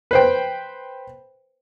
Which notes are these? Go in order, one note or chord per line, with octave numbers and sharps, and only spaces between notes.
B4 C5 G5